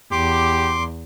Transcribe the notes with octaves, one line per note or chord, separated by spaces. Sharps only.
E2 G4 C6 D6